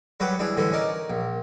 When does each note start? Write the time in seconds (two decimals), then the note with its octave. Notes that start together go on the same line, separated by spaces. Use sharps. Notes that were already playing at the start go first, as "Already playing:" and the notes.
0.20 F#3 G3 G4 B4 C#5 F#5
0.39 E3 G3 D4 G#4
0.57 A2 D3 E3 G3
0.72 C#4 D#4 A#4 D5
1.10 A#1